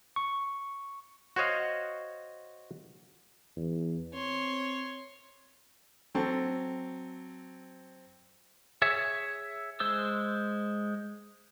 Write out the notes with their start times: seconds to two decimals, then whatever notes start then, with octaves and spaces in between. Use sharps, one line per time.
0.16 C#6
1.36 F#4 C5 C#5 D#5 F5
3.57 E2
4.14 C4 C#5 C6
6.15 F#3 C4 A4
8.82 G#4 C#5 E5
9.80 G#3 C5 E6